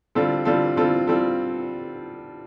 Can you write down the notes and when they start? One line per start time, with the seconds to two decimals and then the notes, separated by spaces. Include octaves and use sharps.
0.15 D3 G3 C4 F4 A4
0.45 D3 G3 C4 F4 A4
0.76 D3 G3 C4 F4 A4
1.07 G3 C4 F4 A4